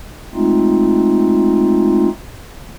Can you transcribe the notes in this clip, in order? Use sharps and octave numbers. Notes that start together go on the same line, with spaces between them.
G#3 A3 C4 D#4 F4